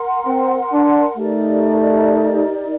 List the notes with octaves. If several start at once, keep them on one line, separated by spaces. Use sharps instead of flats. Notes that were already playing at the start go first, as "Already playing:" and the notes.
Already playing: A#4 F#5 C6
C4
D4
A3 D#4 G4 A#4 D5